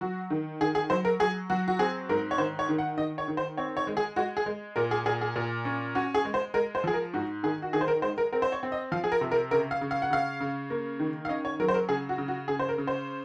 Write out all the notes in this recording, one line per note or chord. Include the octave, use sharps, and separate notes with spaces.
F#3 F#4
D#3
D#3 G#4
G#4
F#3 C5
A#4
F#3 G#4
F#3 F#4
F#4
C4 G#4
G#2 A#4
C#5
D#3 C5
C#5
D#3
F#5
D#3 D#5
C#5
D#3
C5
C4 C#5
C#5
G#3
G#4
G#3 F#4
G#4
G#3
A#2 A#4
G#4
A#2 G#4
G#4
A#2
C#4
C#4 F#4
G#4
G#3
C5
G#3 A#4
C5
F3 G#4
A#4
G#2 F#4
D#3 G#4
F#4
D#3 G#4
C5
A#4
G#3 C5
A#4
C4 A#4
C5
C#5
C4
D#5
F3 F5
G#4
A#4
C3
A#4
C#3 A#4
F5
C#3
F5
F#5
C#3 F5
C#3
A#3
D#3
F5
C#4 D#5
C#5
F#3 A#4
C5
A#4
C#3 G#4
F#4
C#3
F#4
C#3 G#4
C5
A#4
C#3
C5